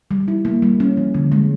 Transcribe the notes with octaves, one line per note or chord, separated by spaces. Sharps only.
G3
E4
A#3
G3
C#4
F3
D3
G#3